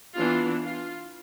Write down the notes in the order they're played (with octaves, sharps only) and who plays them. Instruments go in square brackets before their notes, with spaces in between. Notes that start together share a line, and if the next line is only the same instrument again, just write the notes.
[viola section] E3 B3 D4 F4
F4